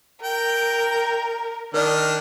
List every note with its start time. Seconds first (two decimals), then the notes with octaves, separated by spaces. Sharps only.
0.23 A#4 G5
1.74 D#3 D4 A#4 D5 F6